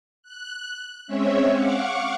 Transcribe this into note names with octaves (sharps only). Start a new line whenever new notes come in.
F#6
G#3 C4 C#4 C#5 E5
F5 F#5 C#6 D6